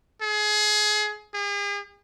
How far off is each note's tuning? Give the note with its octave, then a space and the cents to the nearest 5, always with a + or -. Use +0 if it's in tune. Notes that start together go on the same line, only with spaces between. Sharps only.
G#4 +25
G#4 -40